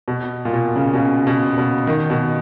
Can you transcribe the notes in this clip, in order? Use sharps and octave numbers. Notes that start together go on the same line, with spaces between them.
B2
A#2
B2
C#3
B2
C#3
B2
B2
D#3
B2